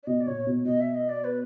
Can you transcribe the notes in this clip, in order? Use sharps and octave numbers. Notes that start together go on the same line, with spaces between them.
D5
B2 D#5
D5
A#2 C#5
B2
B2 D#5
E5
D#5
D5
B4